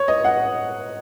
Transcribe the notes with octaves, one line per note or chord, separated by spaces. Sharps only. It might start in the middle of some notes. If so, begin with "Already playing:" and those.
Already playing: C#5
D#5
F#5